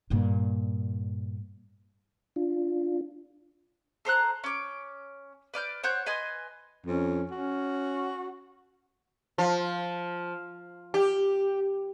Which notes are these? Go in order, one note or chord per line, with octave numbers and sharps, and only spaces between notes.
G2 A#2
D4 F4
A4 C5 A#5 F#6
C#4 D6
B4 D5 F6 G6
C5 C#5 F#5 G6
B4 D#5 G#5 C6
F2 C#4
C#4 F#4
F3
G4